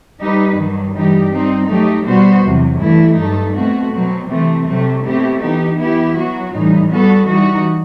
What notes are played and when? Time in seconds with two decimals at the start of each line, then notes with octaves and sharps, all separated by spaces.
0.20 G3 D#4 G4 B4
0.58 G2 D#3 F#3
0.95 G2 E3 G3 D#4 G4
1.32 G3 C4 D#4
1.70 F#3 A3 D#4 G4
2.06 B2 G3 B3 F#4 C5
2.43 E2 C3 F#3
2.80 G2 E3 A3 E4
3.18 G2 F#3 A3 D#4 A4
3.55 B2 A3 C4 F#4
3.93 B2 F#3 C4
4.29 C3 E3 A3 C4
4.67 C3 F#3 A3 C4
5.04 B2 A3 C4 E4 G4
5.41 E3 B3 D#4 G4
5.78 E3 B3 E4 G4
6.16 F#3 B3 F#4
6.53 A2 E3 G3 D#4
6.91 G3 B3 F#4 A4
7.27 E3 G3 D#4 F#4